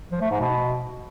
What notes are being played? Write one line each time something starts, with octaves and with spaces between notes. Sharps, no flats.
F3
A3
G#2
B2